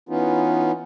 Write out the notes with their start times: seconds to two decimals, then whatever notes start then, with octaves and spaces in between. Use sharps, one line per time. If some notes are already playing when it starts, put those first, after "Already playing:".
0.09 E3 B3 C#4 D#4 F4